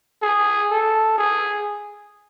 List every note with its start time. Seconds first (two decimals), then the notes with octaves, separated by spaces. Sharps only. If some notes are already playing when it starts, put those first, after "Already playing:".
0.22 G#4
0.70 A4
1.18 G#4